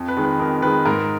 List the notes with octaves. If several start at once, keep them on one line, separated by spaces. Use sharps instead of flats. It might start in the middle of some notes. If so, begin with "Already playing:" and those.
Already playing: F2
B4
D#3 G#3
B4
F2 A#4
D#3 G#3 B4
G#2 A#4